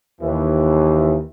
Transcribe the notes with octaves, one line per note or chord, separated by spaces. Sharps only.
D#2 E3